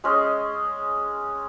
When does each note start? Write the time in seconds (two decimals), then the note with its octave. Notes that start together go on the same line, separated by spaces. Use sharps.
0.04 G#3 C#4 G#4 D#5